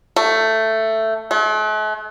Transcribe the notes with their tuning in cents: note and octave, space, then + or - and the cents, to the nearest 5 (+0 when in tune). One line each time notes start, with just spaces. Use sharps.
A3 +10
A3 -45